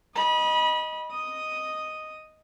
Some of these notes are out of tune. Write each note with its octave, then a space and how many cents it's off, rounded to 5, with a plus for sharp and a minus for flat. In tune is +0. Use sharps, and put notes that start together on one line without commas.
D#5 +0 B5 -30
D#5 +0 D#6 +0